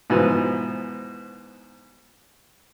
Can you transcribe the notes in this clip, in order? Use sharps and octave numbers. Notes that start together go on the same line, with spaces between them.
G#2 B2 E3 F3